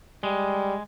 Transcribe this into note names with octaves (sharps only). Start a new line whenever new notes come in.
G3 G#3